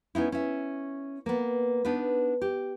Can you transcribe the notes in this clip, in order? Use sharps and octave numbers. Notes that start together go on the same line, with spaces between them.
B3 C#4 D#4 E4
C#4 E5
A#3 B3
B3 D4 D#4 B4
G4